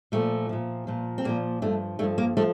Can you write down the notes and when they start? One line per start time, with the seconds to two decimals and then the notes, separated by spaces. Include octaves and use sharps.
0.12 A#2 F3 A3
0.49 A#2 F3
0.87 A#2 F3
1.18 C4
1.24 A#2 F3 A#3
1.62 G2 F3 A3
1.99 G2 F3 A3
2.18 A#3
2.37 F3 A3